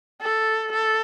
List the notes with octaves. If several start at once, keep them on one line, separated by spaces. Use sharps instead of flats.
A4
A4